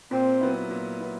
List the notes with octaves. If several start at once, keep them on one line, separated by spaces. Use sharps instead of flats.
A#2 C4
F#3 B3 E4
A#2
F#3 B3 E4